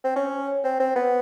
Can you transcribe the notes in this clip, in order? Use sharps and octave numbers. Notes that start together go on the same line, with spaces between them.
C4
C#4
C4
C4
B3